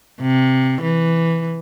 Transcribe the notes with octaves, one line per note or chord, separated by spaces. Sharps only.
C3
E3